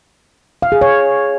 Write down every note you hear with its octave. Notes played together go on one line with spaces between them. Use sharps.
F5
G#4
C#5